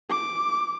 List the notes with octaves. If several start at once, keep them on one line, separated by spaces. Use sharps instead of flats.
D6